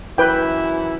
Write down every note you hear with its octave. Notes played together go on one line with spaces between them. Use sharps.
F#2 E3 E4 B4 G5